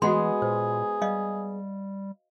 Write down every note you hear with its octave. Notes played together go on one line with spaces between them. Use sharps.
E3 G#3 B3 F#4 G#4 F#5 C6
A#2 C5
G3 D#5 F5